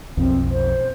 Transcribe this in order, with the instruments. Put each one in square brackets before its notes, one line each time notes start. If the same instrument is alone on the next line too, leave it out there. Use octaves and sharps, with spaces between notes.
[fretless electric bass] B1 F2 F3 [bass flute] C4
[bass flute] C5